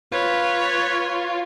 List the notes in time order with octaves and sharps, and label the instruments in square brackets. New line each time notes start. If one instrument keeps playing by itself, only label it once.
[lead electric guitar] F4 [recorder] B4 [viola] C#5